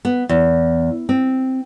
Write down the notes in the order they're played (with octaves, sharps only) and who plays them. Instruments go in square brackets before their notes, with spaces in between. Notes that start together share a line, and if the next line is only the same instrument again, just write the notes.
[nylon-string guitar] B3
E2
C4